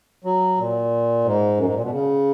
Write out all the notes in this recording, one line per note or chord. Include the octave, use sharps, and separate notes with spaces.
F#3
A#2
G#2
F#2
G#2
A#2
B2
C#3